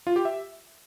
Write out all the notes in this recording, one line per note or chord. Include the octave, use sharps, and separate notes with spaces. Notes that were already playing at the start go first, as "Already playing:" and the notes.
F4
G4
E5